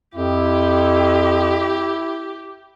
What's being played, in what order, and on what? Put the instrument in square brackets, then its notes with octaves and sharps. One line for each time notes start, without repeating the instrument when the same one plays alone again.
[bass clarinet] F2 [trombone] E4 [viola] G4